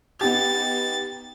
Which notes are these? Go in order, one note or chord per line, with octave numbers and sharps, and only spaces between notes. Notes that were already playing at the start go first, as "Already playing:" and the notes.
B3 D#4 G4 A6